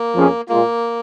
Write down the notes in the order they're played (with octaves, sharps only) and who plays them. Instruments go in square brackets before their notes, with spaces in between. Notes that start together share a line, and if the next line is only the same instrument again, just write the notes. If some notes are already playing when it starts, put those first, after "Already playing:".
Already playing: [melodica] A#3
[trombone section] F2 F3 C#4 G#4
[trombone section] A#2 G#3 F4 [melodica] A#3